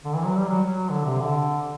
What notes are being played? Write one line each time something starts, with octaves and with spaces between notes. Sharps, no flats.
D3
E3
F#3
G3
F#3
F#3
D3
C3
D3